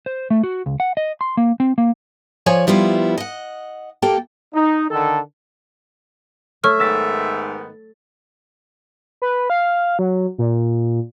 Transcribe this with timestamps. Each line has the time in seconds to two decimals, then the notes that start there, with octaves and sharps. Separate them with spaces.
0.06 C5
0.30 A3
0.44 F#4
0.66 C#2
0.80 F#5
0.97 D#5
1.21 C6
1.37 A#3
1.60 C4
1.78 A#3
2.46 F3 C#5 D5 G#5
2.67 F3 G3 B3 E4 F4
3.18 D#5 F#5
4.02 A#3 G4 A4 G5
4.55 D#4
4.91 D3 D#3 A4
6.64 A3 C#5 E5 C#6 F6
6.80 G#2 D#3 B3 E6 A6 B6
9.22 B4
9.50 F5
9.99 F#3
10.38 A#2